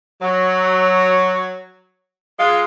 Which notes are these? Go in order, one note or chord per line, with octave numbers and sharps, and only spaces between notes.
F#3
G#3 F4